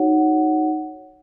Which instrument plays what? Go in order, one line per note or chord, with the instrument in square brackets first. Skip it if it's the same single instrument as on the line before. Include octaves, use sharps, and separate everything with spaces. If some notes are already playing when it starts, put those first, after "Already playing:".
Already playing: [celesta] D#4 F#4 C#5 F#5